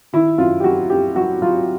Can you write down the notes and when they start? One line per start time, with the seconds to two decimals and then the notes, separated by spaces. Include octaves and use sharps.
0.13 D#3 E4
0.38 F#2 F4
0.60 G4
0.64 F#3 F#4
0.90 F#2 G4
1.15 F#3 F#4
1.42 F#3 F4